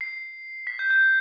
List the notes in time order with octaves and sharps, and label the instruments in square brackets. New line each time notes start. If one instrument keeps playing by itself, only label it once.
[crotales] C7
B6
G6
G6